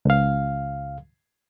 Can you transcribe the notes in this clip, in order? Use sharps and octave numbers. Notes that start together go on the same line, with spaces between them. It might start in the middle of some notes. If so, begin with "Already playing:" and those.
C#2 F5